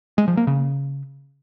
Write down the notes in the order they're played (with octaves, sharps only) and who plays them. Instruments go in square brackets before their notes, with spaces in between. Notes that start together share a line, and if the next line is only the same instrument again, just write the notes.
[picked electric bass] G#3
F3
A#3
C#3